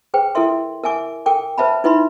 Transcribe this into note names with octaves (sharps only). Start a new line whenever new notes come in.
G#4 B4 C5 G5
E4 A4 A#4 E5 C6
A#4 E5 G#5 D6
A4 A#4 G5 D6
B4 C5 E5 A5 B5
D#4 E4 B4 E5 B5 C6